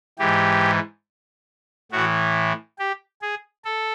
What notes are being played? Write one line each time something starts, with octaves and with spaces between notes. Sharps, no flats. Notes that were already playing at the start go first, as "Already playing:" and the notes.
G#2 E3 G4
A2 E3 F#4
G4
G#4
A4